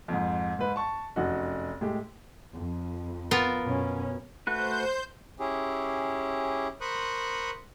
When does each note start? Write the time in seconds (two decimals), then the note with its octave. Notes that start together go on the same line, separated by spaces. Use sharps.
0.08 F2 G#2
0.59 G#2 B4
0.76 A5 C#6
1.16 F1 F#2 D#4 F#4
1.81 A2 G#3 G4
2.54 F2
3.31 B3 F4 A#4
3.64 F#2 B2 C#4
4.47 A3 F#4 B4 C5 G6
5.39 C#4 E4 G4 G#4
6.81 A#4 C5 B5 C#6 D#6 F#6